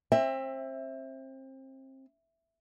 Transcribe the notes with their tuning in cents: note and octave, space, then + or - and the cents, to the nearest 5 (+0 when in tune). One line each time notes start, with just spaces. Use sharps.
C4 +30 E5 +0